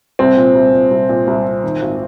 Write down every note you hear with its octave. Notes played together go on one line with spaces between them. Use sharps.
C2 C4
A#2
C2
A#2
C2
A#2
C2
A#2
D#3
G#1